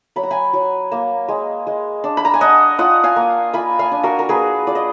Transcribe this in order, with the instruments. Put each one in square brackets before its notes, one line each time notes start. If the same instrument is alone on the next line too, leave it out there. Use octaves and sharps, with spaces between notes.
[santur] F#3 B5
A#5
G#5 B5
F#3
A#3
G#3
G#3
D4
B5
A#5
G#5
D4 D#5 F#5
F4 D#5 F#5
F5 G#5
A#3
F4 G#5 B5
F5 G#5
D4
F#4 A#4
A#4
A#3 G#4 B4
F4 D5
D#5